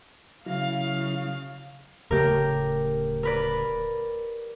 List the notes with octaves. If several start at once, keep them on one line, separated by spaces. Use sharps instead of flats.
C#3 F#3 E4 F5
D1 C#3 A3 G4 A#4
A#4 B4 D5